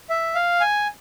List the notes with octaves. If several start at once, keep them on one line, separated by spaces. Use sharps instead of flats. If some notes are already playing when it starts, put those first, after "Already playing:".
E5
F5
G#5